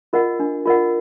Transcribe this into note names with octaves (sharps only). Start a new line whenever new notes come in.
F4 A#4 D#5 F#5
D4
F4 A#4 D#5 F#5